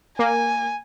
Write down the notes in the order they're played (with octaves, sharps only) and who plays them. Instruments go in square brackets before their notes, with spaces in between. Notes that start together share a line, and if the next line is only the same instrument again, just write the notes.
[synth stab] A#3 [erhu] G#5